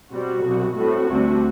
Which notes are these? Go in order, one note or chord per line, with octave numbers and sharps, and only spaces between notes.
B2 G3 C4 F#4
C2 B2 F#3
A2 G3 C4 F#4
D2 C3 G3 D4